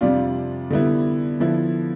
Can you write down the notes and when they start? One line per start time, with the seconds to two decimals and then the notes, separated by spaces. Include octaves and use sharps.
0.01 F2 C3 G3 D4 F4
0.70 D3 G3 B3 E4
1.40 D3 F3 B3 E4